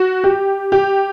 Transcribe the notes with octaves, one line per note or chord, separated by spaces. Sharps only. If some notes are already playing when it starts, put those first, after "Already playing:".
Already playing: F#4
G4
G4